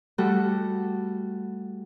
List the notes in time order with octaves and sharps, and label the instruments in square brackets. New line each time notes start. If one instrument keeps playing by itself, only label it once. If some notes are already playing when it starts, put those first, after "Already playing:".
[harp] G3 A3 F#4 A4